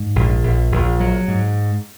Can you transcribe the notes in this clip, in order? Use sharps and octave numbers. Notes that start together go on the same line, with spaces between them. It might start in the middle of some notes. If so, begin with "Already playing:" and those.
Already playing: G#2
A#1
A#1
A#1
F#3
G#2